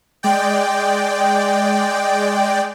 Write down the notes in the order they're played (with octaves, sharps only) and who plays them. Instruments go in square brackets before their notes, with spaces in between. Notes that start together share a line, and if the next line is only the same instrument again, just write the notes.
[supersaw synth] G#3 D5 G5